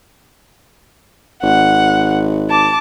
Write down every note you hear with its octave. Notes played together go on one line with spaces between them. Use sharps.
G#1 F#5
A5 D6